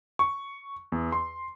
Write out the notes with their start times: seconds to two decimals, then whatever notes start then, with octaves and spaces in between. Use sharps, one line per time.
0.19 C#6
0.92 E2
1.12 C6